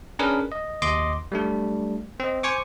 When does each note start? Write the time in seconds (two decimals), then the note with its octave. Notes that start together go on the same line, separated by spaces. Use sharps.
0.19 C#4 D4 G#4 A#4 B4
0.52 D#5
0.82 D#2 D#5 C6 D6
1.32 G3 A3 D4
2.20 C4 D#5
2.43 C5 G#5 C#6 D6